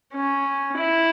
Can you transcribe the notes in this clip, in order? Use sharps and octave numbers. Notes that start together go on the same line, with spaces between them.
C#4
E4